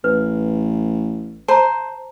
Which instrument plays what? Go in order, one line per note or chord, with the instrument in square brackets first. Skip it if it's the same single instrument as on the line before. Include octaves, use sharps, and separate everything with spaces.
[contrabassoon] A1 [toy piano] B4
[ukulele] C5 [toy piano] A5 A#5